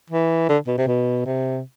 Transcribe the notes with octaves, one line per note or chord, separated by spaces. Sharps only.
E3
D3
B2
C3
B2
C3